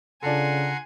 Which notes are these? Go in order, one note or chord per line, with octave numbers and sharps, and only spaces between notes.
C#3 D4 F4 A4 F#5 G#5 A#5 C6